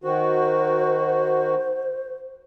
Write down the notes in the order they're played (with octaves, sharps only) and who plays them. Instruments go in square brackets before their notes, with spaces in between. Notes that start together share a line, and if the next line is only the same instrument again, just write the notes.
[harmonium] D#3 F#4 [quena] C5